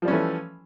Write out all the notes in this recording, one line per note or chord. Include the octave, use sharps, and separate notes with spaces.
E3 F3 G3 A3 C#4